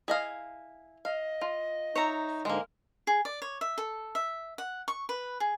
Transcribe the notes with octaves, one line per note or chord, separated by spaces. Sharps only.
E4 G#4 D#5 F5
D#5 F5
F4
D#4 C#5 E5 A#5
G#2 D3 G#3 A#3 A#4
G#4
D5
C#5
E5
A4
E5
F#5
C#6
B4
G#4